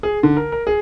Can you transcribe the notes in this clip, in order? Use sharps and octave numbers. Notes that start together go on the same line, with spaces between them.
G#4
D3
A#4
A#4
G#4